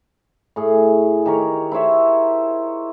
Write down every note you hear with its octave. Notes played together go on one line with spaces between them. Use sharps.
A2 G#4
D#3 G4 A#4 C#5
E4 C5 C#5 E5